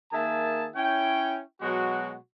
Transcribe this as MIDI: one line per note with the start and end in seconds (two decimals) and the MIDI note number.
0.12 0.68 51
0.12 0.68 58
0.12 0.68 68
0.12 0.68 76
0.12 0.68 81
0.75 1.40 61
0.75 1.40 64
0.75 1.40 73
0.75 1.40 79
1.61 2.15 47
1.61 2.15 54
1.61 2.15 56
1.61 2.15 66